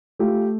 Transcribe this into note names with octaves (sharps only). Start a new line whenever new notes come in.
A3 F4 G4